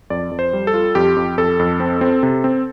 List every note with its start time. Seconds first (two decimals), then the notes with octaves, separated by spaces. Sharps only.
0.10 F2 D5
0.31 F2
0.39 C5
0.53 G3
0.67 A4
0.74 F4
0.95 F2 G4
1.16 F2
1.37 F2 A4
1.59 F2
1.80 C4
2.01 C4
2.23 C3
2.44 C4